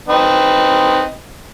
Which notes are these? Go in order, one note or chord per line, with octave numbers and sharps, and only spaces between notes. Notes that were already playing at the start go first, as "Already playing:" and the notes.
C4 D#4 B4